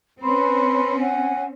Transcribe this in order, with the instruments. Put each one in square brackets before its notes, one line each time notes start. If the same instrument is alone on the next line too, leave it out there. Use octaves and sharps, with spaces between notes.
[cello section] C4 C#4 [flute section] B4 B5 C6
[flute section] F#5 G#5